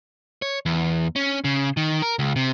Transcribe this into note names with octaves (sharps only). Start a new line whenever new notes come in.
C#5
E2
C#4
C#3
D#3
A#4
C#2
C3